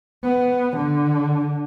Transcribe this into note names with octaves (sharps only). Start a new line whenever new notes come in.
B3
D3